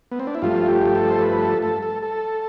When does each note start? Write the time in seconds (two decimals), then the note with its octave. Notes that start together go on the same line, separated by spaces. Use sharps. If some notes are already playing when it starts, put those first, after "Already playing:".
0.11 B3
0.19 C4
0.27 D4
0.35 E4
0.42 G2 F3 A3 F4
0.68 G4
0.95 A4
1.10 C5
1.21 B4
1.42 A4
1.62 A4
1.82 A4
2.03 A4